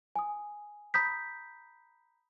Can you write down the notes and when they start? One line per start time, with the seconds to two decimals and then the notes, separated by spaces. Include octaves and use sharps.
0.16 G#5 D#6
0.94 A#5 B5 D#6 G6 B6